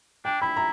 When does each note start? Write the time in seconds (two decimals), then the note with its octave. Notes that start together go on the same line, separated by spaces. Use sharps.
0.25 D4 G5
0.41 E4 B5
0.57 A#5